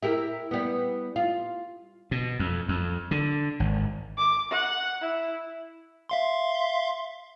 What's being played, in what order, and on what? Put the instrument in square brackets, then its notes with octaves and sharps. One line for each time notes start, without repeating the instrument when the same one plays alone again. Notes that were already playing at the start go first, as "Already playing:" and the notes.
[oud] E4 G4 A#4
G3 B3
F4
[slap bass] B2
F2
F2
D3
G#1
[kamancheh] D6
F#5
E4
[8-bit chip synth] E5 F5 C6